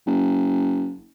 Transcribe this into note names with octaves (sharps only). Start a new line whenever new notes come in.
F#1